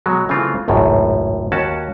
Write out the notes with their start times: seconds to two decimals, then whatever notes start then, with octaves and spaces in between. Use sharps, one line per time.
0.06 B2 F#3 G#3
0.29 C#3 E3 A3 C4 F4
0.68 G#1 C#2 F#2 A2
1.52 D#2 C#4 F#4 A5